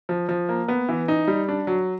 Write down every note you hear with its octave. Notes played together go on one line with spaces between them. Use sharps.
F3
F3
A#3
B3
E3
D#4
G3
D4
F#3